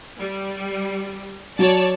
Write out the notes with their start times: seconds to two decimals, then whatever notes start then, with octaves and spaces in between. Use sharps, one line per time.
0.21 G3
1.59 F#3 C#5 D5 A5